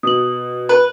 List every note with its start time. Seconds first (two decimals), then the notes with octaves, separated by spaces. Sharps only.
0.03 B2 D#6 F#7
0.69 B4